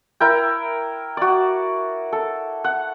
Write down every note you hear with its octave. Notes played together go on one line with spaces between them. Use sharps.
E4 A#4 G5
F#4 D5
A4
F#5